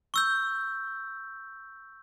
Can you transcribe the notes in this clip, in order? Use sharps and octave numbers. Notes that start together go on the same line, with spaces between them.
C#6 E6 G6